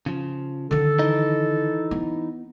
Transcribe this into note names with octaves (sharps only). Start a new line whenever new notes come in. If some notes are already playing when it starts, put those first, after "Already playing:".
C#3 F3
D3 D#3 A4
E3 D#4
B3